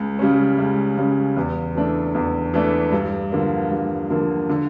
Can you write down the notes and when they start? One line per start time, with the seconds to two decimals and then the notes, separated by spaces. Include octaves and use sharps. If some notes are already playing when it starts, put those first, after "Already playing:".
Already playing: C#2
0.19 C#3 G3 C#4
0.59 C#2
0.97 C#3 G3 C#4
1.37 E2
1.75 E3 A3 D4
2.15 E2
2.54 E3 A3 D4
2.92 G2
3.32 D3 F3 A#3
3.71 G2
4.10 D3 F3 A#3
4.50 D3